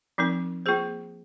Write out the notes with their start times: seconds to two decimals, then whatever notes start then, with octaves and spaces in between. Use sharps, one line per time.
0.18 F3 C4 D#4 A#4
0.66 A#3 F4 G#4 C5